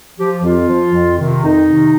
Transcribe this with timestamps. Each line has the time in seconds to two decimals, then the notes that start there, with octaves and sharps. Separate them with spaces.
0.19 F3 G4
0.43 F2 F4
0.68 F3
0.93 F2
1.18 C3 D#3
1.43 F2 D#4
1.67 C3 D#3